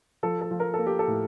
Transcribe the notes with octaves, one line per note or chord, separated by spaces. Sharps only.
F3 A4
A4
F3
A#4
A4
A#3
G4
A4
A2